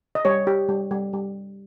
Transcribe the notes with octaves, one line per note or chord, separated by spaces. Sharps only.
D#5
G3 C#5
G4
G3
G3
G3